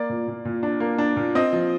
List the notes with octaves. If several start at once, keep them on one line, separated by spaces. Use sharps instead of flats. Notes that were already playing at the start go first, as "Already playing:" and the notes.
Already playing: A#3 D5
A#2
A#2
A#2
D4
A#3
D4
A#2
C4 D#5
F3